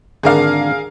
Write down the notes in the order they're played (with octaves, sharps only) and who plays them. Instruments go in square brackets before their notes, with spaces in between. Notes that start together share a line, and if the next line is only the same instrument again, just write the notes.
[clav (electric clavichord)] G#1 D3 D4 [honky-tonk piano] G#4 A#4 F5